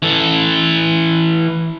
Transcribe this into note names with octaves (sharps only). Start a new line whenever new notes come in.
E3 A4